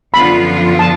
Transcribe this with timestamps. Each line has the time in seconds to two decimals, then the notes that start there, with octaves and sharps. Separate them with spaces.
0.14 F#2 D3 F3 B3 F4 B5
0.79 A5